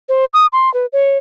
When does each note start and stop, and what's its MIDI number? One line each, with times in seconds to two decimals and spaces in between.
0.09 0.25 72
0.34 0.46 87
0.53 0.72 84
0.74 0.86 71
0.93 1.18 73